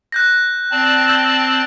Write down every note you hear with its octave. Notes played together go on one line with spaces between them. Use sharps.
F#6 G6 A#6
C4 D5 A5
E6 G6